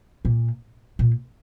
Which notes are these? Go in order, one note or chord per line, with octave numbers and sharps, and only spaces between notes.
A#2
A#2